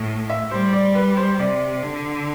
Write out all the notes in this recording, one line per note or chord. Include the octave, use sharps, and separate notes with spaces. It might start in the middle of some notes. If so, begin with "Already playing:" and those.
Already playing: A2
E5
G3 C5
D5
B4
C5
C3 D5
D3